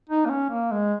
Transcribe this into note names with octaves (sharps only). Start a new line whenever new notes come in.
D#4
A#3
C#4
A#3
G#3